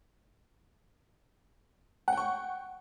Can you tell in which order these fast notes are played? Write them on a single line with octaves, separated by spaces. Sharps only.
F#5 G5 C#6